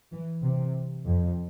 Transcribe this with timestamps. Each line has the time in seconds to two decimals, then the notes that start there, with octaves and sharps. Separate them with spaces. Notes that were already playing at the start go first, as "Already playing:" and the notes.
0.11 E3
0.43 C3
1.06 F2